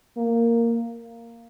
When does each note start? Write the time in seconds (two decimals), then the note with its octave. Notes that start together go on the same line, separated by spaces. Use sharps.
0.17 A#3